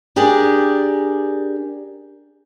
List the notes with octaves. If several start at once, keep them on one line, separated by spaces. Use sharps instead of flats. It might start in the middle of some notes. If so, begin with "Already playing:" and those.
D4 G4 G#4 A#4 D5